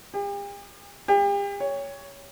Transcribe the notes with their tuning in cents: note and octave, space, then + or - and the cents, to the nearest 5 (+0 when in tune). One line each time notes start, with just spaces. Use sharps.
G4 +45
G4 +40
C#5 +10